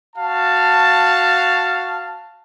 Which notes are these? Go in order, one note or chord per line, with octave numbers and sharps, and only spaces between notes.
F#4 F5 A5